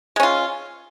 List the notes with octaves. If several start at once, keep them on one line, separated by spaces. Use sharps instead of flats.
G#3 C#4 F4